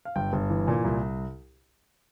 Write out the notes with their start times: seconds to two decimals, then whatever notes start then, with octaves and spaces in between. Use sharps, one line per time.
0.05 F5
0.16 G1 G5
0.33 G1
0.50 E3
0.67 A#2 G#5
0.84 C2